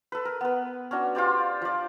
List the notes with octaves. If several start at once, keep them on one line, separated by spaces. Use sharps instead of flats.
A4 B4
A#4
B3 B4
C#4 D4 F#4
F4 G4 C5 D5
F3 D5